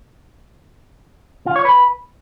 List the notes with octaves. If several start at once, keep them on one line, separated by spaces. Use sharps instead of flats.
F4
C#5
B4